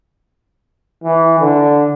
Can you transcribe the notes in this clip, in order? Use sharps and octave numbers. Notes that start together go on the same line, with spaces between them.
E3
D3